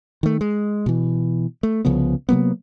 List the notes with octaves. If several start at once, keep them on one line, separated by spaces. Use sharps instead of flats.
D#3 A3
G#3
B2 E3
A3
C2 C#3 F3 B3
C3 F#3 A#3 B3